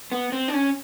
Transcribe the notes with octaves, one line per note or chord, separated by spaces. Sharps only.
B3
C4
D4
C#4